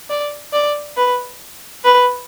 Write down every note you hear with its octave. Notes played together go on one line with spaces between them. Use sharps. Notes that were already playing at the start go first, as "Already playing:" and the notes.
D5
D5
B4
B4